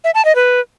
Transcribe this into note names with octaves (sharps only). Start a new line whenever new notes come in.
E5
A5
D#5
B4